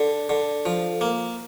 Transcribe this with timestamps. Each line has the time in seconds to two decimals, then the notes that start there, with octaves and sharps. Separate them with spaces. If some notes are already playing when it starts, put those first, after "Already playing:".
Already playing: D3
0.29 D3
0.66 F3
1.01 A#3